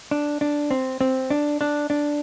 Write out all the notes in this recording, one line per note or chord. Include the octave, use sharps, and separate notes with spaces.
D4
D4
C4
C4
D4
D4
D4